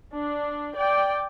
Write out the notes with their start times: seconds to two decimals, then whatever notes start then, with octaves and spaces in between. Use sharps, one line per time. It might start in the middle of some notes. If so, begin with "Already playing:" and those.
0.14 D4
0.76 D5 G5